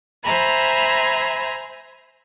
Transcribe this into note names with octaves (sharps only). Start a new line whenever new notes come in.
C5 E5 G#5 A#5 B5